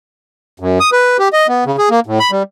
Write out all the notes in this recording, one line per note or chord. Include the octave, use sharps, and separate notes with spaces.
F#2
D#6
B4
G4
D#5
B3
C#3
G#4
A#3
A2
B5
G3